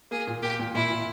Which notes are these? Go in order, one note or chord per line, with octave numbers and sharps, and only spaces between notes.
A#3 G#4
A#2
A#3 G4
A#2
A#2 E4
A#2